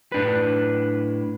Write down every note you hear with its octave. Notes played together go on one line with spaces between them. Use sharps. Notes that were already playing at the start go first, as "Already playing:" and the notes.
A2 D4 B4